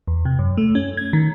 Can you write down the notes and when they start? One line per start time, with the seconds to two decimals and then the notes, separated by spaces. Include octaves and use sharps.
0.08 E2
0.25 C3
0.39 F#2
0.57 A3
0.75 C#4
0.97 G#6
1.13 D#3